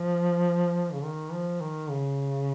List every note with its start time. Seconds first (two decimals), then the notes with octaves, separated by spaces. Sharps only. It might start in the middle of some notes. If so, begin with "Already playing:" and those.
Already playing: F3
0.93 C#3
1.04 D#3
1.33 F3
1.61 D#3
1.90 C#3